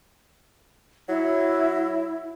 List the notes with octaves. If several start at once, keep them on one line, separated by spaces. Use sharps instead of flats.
F#3 E4